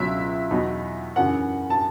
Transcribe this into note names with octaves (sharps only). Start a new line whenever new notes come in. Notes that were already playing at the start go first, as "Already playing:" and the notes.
Already playing: C#2 B2 F#3 C#4 E5
E2 B2 F#3 B3 D#4
F#2 C#3 E3 F#5
A5